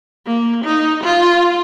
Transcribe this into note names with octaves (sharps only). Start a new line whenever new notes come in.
A#3
D#4
F4